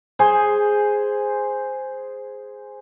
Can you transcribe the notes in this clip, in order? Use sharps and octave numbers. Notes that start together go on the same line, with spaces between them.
G#4 C5 G#5